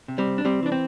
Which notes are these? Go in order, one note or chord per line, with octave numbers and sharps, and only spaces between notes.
C3
G3 C4
C2
D4
C2 G3 C4
E3 D4
C4